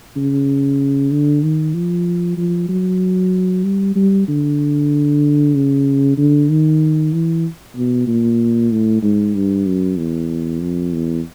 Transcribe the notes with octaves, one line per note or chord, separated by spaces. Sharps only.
C#3
D3
D#3
F3
F3
F#3
G3
G3
D3
C#3
D3
D#3
E3
B2
A#2
A2
G#2
G2
F#2
E2
F2
E2